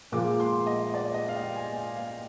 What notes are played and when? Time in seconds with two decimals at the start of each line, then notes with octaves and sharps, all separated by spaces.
0.12 A#2 F3 G#3 D6
0.40 C6
0.66 D#5
0.94 D5
1.14 D#5
1.29 F5
1.35 G5
1.56 G#5
1.76 G5
1.97 F5